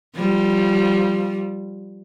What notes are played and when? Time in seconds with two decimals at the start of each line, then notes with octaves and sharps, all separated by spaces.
0.16 F3 G3